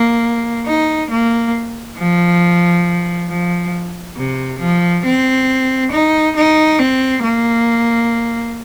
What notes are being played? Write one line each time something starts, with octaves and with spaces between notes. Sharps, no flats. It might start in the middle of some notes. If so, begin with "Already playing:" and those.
Already playing: A#3
D#4
A#3
F3
F3
C3
F3
C4
D#4
D#4
C4
A#3